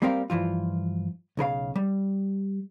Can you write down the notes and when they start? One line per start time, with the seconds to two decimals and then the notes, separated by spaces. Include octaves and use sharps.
0.02 G3 A#3 C4 G4 A#4 F5
0.30 G2 E3 F3 F4
1.37 B1 C#3 A#4 F5
1.76 G3